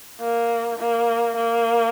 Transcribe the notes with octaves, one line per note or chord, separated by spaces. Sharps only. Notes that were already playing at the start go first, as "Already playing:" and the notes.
A#3
A#3
A#3